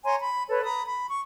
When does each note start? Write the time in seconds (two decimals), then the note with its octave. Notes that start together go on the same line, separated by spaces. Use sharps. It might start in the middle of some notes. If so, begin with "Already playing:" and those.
0.04 C#5 G#5 A#5 C6
0.20 B5
0.49 A4 B4 C#5
0.65 A#5 B5 D#6
0.86 B5
1.10 C#6